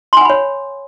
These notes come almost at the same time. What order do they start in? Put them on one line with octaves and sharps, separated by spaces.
C6 G#5 F#5 B5 C#5